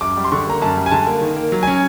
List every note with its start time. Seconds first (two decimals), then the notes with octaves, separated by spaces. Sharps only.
0.01 F#2 D6
0.17 G3
0.24 C6
0.31 D3 C#6
0.47 A#3 A#5
0.61 F#2 A5
0.77 G3
0.86 G#5
0.91 D3 A5
1.07 A#3
1.21 D#3
1.37 A#3
1.52 F#3
1.63 C#4 G#5